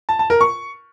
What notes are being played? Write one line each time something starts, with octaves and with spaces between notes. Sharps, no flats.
A5
A5
A#4
C#6